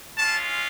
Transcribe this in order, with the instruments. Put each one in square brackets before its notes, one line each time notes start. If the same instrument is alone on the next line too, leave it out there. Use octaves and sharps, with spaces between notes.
[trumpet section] G#3 C#4 F4 A5